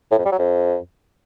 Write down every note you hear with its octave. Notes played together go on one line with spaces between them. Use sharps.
A2
F2
G3
F#3
F2